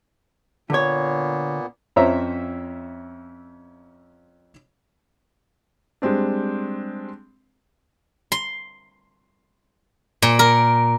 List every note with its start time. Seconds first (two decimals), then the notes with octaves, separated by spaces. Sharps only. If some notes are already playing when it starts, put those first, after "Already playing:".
0.70 A#2 D3 A#3 B3 C#5
1.96 F2 F3 C#4 C5 E5 A#5
6.02 G3 G#3 C4 D4
8.32 C6
10.22 A#2
10.39 A#4